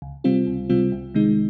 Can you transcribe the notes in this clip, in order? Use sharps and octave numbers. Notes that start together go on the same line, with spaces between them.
C#2
C3 G3 C4 F4
C#2
C3 G3 C4 F4
C2
C3 D#3 G#3 D#4